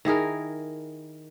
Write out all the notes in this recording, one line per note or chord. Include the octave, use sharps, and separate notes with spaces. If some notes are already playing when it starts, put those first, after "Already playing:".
D#3 E4 G#4 A#4